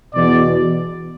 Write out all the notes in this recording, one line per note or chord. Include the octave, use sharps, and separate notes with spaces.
E2 B2 D5